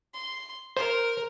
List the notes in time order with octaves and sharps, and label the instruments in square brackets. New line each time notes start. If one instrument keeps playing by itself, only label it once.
[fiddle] C6
[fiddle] A#4 [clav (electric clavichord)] C5